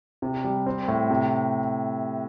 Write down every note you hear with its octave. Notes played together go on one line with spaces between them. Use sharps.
C3
G3
C4
A2
C3